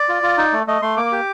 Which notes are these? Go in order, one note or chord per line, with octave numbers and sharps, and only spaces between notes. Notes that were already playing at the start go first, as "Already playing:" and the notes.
Already playing: D5
F4
F4
D#4
A3
A3 D#5
A3 C6
A#3 D6
G4